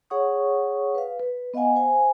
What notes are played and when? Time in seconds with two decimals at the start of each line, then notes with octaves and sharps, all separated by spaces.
0.10 G#4 C#5 F#5 C#6 D#6
0.95 B4 F5
1.20 B4
1.54 B3 D#5 F5 F#5 G#5
1.76 C5 F5 G#5